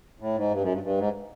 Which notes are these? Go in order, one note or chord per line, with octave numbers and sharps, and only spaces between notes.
A2
G#2
G2
F#2
G2
G2
G#2